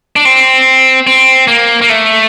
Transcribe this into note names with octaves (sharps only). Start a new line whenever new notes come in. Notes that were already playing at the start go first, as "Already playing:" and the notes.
D4
C4
C4
A#3
A#3
A3